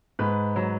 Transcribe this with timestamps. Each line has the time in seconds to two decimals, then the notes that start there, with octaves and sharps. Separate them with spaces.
0.19 G#2 B4
0.56 F#3